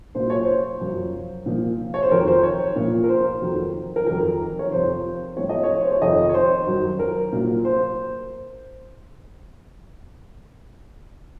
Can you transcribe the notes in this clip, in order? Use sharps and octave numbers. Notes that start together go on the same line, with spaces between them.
A#2 F#3 C5
C#5
C5
F#2 F3
A#2 F3
C#5
C5
F2 D#3 F#3 A#4
C5
C#5
A#2 F3
A#4
C5
F2 D#3 F#3
A#4
F2 D#3 F#3 A#4
C#5
F2 C3 F3 C5
A2 F3 C#5
D#5
C#5
C5
C#5
F2 C3 D#3 D#5
C#5
C5
F#2 D#3 F#3
A#4
A#2 F#3
C5